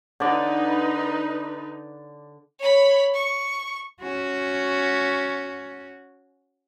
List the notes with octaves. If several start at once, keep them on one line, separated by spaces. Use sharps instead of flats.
D3 D#4 B4 D5
C#5 B5
C#6
C#4 F#4